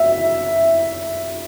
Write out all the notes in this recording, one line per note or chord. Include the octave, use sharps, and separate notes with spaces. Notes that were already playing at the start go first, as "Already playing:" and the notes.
Already playing: E5